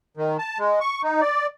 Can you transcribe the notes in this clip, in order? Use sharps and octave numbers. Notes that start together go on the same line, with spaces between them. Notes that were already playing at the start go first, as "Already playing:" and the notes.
D#3
A5
G#3
C#6
D#4
D5